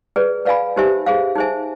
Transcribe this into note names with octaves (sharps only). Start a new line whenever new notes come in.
G#4 B4 D5
B4 D5 F5 G#5 B5
D#4 G4 C5 E5 G#5
G#4 C5 F5
D#4 G#4 C5 E5 G#5